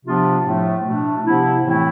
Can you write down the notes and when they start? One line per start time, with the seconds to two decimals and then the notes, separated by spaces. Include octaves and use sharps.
0.05 C3 F3 B3 D4 F4
0.45 A2 F3 A3
0.85 B2 A3 D4
1.25 C3 F3 B3 E4
1.64 A2 E3 A3 C4 E4